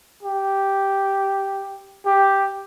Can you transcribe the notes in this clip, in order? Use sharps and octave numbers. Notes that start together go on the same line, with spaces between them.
G4
G4